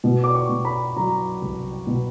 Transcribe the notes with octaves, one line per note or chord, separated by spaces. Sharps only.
B2
D6
C#6
B2
B5
F#3 A#5
C2
B2